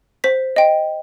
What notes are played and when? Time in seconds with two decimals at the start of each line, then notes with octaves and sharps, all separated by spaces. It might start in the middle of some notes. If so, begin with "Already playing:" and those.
0.24 C5 B6
0.56 D#5 G5